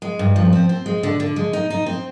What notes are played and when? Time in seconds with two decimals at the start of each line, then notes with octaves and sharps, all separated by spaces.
0.02 G#3
0.19 G2
0.36 F3
0.53 C4
0.69 C4
0.86 G#3
1.03 D3
1.20 D3
1.36 G#3
1.53 D#4
1.70 D#4
1.86 C4